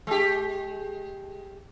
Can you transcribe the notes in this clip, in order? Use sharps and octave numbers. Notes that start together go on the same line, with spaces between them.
G#3 G4